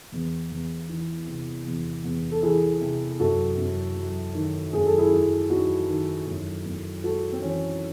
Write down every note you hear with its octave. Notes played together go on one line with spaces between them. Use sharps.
E2
E2
E3
C3
E2
E2
A4
E3 E4 G#4
C3
F#2 F#4 A4
F#2
F#3
D#3
F#2 G#4
A4
E4 G#4
F#2
F#3 D#4 F#4
D#3
F#2
F#2
G#3 F#4 A4
C4
E3 C#4